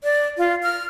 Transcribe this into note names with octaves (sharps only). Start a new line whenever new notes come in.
D5
F4
F6